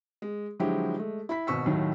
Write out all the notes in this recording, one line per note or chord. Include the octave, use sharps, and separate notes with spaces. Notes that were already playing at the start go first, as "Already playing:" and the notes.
G#3
D3 F3 F#3 G#3 E4 G4
G#3 A3
E4 B5 B6
G#1 B2 F#4 C#6 E6 B6
D#2 A2 D#3 F#3